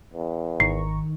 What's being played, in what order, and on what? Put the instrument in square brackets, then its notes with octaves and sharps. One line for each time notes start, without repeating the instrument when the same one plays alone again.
[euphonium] E2
[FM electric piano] G#1 A#5 C#6 [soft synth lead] D#3 [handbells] C7